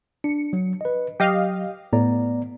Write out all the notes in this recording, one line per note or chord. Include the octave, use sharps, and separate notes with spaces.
D4 C#7
F#3
B4 D#5
F#3 G4 D#5 F5
A2 B3 D5 A#5